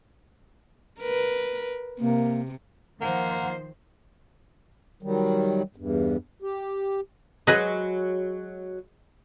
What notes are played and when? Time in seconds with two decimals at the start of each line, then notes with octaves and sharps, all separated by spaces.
1.00 A#4 B4
1.99 C3 A#3
3.01 D#3 F3 A#3 C5 F#5
5.03 D#3 F#3 G3
5.76 E2 G2
6.42 G4
7.47 F#3 G#3 G#4 B4 D#5